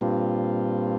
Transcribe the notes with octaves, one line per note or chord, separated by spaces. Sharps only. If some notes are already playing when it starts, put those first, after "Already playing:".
G2 A#2 G3 C4 F4